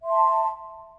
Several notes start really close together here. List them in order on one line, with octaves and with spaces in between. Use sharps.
E5 C6 A5